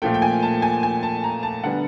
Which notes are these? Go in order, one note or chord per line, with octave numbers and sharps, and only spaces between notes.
A#2 F3 A3 G5
G5
G#5
A5
G#5
G#5
A5
A#5
A5
D3 G3 B3 F#5